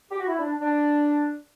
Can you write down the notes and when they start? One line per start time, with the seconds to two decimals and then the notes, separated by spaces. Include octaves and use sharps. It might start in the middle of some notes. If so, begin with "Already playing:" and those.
0.11 G4
0.19 F#4
0.27 E4
0.38 D4
0.60 D4